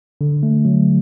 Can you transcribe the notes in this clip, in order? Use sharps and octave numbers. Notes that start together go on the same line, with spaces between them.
D3
A3
F#3